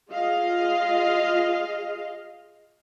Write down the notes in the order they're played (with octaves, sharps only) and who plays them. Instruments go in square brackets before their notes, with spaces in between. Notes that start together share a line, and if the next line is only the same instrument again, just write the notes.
[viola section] F4 G#4 D#5 F5